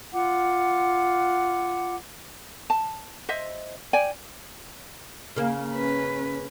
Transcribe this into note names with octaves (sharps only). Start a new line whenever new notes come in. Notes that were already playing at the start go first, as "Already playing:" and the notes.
F4 F#5 D6
A5
C5 D#5 E5
D5 G5 G#5
C#3 A#3
C#4 B4